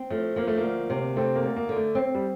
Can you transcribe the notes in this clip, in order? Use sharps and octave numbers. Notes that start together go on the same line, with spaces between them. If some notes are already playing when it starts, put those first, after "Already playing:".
Already playing: C4
F3 A3
F3 A#3
A3
A#3
D2
C3
A3 C4
A#3
D2
A#3
D3
A3
C4
G3